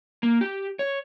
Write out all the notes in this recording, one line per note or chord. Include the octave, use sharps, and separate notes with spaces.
A#3
G4
C#5